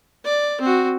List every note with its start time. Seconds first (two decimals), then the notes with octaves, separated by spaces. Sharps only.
0.25 D5
0.61 C4 F#4